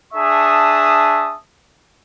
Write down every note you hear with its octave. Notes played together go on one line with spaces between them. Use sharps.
D4 G#4 E5 A5 C#6 D#6